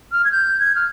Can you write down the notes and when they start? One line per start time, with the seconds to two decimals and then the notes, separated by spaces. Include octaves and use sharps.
0.12 F6
0.24 G#6
0.32 G6
0.59 G#6
0.75 F6